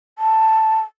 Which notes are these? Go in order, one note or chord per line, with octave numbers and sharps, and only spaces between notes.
A5